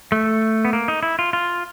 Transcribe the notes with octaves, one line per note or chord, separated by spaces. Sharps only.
A3
B3
A#3
D#4
E4
F4
F4